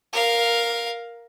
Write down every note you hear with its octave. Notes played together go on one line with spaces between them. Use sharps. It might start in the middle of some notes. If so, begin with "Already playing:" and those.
A#4 F5